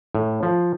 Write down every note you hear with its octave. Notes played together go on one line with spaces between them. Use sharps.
A2
F3